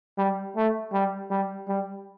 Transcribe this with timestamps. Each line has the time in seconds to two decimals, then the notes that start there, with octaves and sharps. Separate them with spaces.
0.18 G3
0.56 A3
0.93 G3
1.31 G3
1.68 G3